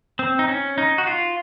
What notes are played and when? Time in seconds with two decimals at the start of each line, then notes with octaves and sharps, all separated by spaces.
0.19 C4
0.39 D#4
0.48 C#4
0.78 D#4
0.98 F#4
1.07 F4